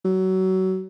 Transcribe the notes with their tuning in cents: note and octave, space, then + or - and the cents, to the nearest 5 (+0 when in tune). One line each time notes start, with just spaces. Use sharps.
F#3 +25